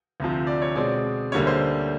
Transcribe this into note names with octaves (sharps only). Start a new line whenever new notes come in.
D2 C3 F3
D5
C#5
B2 G#3 C4 D5
D2 D3 G3 A#3 C#4 C#5
C5